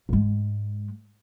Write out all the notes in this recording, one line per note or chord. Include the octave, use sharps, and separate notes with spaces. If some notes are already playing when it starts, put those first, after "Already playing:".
G#2 G#3